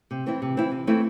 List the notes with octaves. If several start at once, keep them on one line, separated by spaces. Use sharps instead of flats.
C3
E3 C4 E4
C3
E3 C4 E4
C3
E3 A3 C4 E4